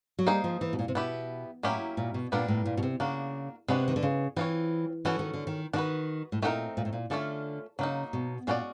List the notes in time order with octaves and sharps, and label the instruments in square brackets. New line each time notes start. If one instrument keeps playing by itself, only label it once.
[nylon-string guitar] F#3
[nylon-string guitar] G3 [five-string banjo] A#3 D#4 G#4 C5 D#5
[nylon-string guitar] F3
E3
B2
A#2
C3
[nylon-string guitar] B2 [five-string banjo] B3 E4 G4
[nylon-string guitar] A2 [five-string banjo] F#3 A#3 C#4 E4 G4
[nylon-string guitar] A#2
B2
[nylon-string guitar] A#2 [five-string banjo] G3 B3 D4 F4 A#4
[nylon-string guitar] A2
A#2
B2
C3
[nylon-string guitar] C#3 [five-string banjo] A#3 D4 F#4
[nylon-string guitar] C3 [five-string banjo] G#3 B3 D4 F#4
[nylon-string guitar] D#3
D3
C#3
[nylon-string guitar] E3 [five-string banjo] C4 F4 G#4 C#5
[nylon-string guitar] E3 [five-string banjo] C#4 F#4 A4
[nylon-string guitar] D#3
D3
D#3
[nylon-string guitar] D#3 [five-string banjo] D4 F#4 B4
[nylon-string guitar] A2
[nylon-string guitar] A#2 [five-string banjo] A3 C4 D#4 F#4 A#4
[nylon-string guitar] A#2
A2
A#2
[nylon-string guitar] D3 [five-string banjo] A3 C#4 F4 A4 D5
[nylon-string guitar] C#3 [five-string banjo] F#3 A#3 D#4
[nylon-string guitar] B2
[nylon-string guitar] A#2 [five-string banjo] G#3 C#4 F#4 B4 D5